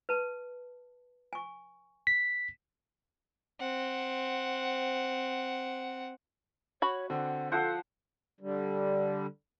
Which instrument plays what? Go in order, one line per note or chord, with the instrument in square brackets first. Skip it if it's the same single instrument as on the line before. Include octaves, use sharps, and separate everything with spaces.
[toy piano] B4 A5
G#5 C#6
[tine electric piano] B6
[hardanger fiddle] C4 F#5
[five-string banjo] F#4 B5 [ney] C#5
[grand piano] D3 C4 [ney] F#5
[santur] F3 C5 F#5 [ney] A4
[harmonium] D3 G3